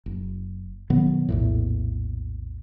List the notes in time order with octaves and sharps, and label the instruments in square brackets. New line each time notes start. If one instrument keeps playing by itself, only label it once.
[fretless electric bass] F#1
B2 D#3 F#3 B3
A#1 E2 A2